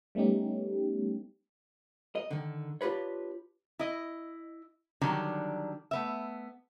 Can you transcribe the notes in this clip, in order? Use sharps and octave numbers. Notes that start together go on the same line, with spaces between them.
G3 A3 B3 C#4 D#4 G4
D#5
D3 D#3
D4 F4 G4 B4 C#5
E4 D#5
D3 D#3 F#3 G3 D4
A3 B3 E5